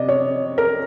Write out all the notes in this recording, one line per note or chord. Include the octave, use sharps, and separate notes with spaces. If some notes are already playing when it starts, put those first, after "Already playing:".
Already playing: C3 D5 D#5
C#5
A#4